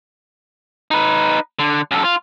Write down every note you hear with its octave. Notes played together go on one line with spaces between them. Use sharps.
D#4 B4
D3
F#2 A4
F4